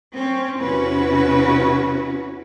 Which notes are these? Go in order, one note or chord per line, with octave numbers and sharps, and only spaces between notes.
C4 C#4
E2 C3 C#4 E4 F#4 B4